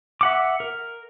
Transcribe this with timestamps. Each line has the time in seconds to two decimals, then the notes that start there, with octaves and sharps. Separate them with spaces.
0.21 E5 F#5 D6
0.60 A#4